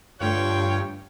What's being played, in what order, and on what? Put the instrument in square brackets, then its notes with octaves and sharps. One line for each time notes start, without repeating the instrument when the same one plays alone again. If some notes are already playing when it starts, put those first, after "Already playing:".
[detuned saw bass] G2 [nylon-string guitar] D3 A3 D4 [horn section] F4 C#5 [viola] G5